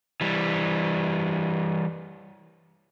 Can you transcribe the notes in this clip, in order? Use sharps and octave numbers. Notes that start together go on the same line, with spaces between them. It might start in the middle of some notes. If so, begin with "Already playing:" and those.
E3 G3